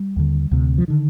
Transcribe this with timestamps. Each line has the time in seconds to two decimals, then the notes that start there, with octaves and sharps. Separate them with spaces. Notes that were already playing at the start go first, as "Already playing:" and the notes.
Already playing: G3
0.16 D#2 D3
0.51 D2 C3
0.78 F3
0.88 D3 D#3